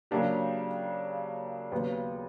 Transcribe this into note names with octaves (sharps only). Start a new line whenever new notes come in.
C#3 F#3 A#3 D4 G4
D#2 C#3 F#3 B3